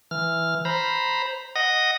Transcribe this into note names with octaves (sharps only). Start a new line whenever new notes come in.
E3 F6
C5 A#5 B5
D#5 F#5 D#6 A#6